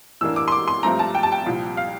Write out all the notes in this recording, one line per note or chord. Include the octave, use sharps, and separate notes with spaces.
A2 E3 A#3 D4 E6
D6
C6
D6
C6
G2 F3 A3 C4 A#5
A5
G5
A5
G5
C2 A#2 F3
F5